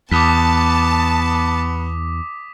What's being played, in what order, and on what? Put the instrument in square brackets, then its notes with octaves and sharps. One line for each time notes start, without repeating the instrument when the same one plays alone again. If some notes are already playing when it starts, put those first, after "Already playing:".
[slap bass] E2 [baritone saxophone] B3 [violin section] A5 [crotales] D6 D#6 B6